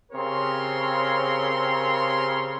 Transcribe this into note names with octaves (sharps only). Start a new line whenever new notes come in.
C#3 C4 G4 A#4 C#5 C6